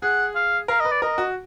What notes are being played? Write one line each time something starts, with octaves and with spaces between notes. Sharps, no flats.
G#4 F#5
F5
A#4 F5
B4 D#5
D5
A#4 D#5
F#4